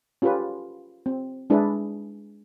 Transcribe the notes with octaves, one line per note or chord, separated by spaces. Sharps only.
C#4 F4 G4 A4 B4
C4
G#3 D4 E4 G#4 B4